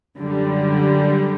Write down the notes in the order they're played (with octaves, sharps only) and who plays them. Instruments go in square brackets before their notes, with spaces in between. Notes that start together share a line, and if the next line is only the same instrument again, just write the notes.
[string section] F#2 D3 G3